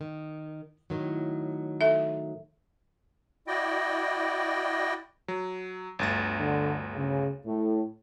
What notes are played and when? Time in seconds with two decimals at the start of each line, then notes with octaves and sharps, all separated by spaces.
0.01 D#3
0.90 A2 D#3 F#3
1.81 A4 E5
3.47 E4 F#4 D5 D#5 G5
5.28 F#3
5.99 G1 D2 A6
6.39 D3
6.95 C#3
7.45 A2